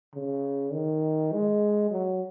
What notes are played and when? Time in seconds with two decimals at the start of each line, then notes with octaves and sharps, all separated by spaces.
0.15 C#3
0.73 D#3
1.32 G#3
1.90 F#3